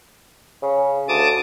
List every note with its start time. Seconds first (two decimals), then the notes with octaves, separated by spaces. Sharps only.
0.63 C#3
1.08 D2 A5 D6 D#6